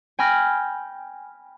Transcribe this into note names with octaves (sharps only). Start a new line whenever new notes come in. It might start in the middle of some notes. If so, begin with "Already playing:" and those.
G5 G#5 B5 F6 A#6